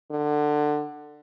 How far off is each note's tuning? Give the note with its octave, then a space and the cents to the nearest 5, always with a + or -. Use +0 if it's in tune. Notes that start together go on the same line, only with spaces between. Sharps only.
D3 +20